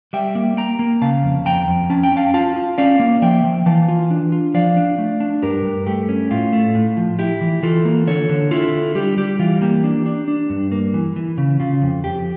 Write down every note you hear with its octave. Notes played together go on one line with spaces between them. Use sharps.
G3 E5 G5
A#3
A#3 G5 A#5
A#3
C#3 F5 A5
F2
F2 G5 A#5
F2
C#4 A5
G5
C#4 F5 A5
F4 F5 A5
F4
C#4 D5 F5
A#3
F3 E5 G5
F3
E3 F5 A5
F4
D4
F4
F3 D5 F5
D4
A3
D4
G2 G4 A#4
G2
A3 G4
C#4
A2 F4
A3
A2
F3
E4 G4
E3
E3 F4 A4
A#3
D3 A4 C#5
D3
E4 F4 A4
D3
G3 G4
G3 G4
E3 F4
A#3 G4
D4
D4
D4
G2
A#3
E3
E3
C#3
C#3 F4
F2
F2 G4